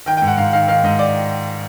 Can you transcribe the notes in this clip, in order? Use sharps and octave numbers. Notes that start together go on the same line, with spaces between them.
D#3 G5
G#2 G5
F#5
G#2 F5
D#3 F5
D#3 F5
G#2 D#5
D5